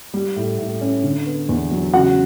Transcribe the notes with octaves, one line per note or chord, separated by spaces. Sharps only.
G3
A2
A2
C#4
D3
B3
E2
F#3
C#3 F#4 F#5